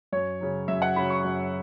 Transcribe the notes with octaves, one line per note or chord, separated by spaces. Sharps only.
F#2 C#5
C#3 F#3
F#2 E5
F#5
C#3 F#3 B5
C#6
F#2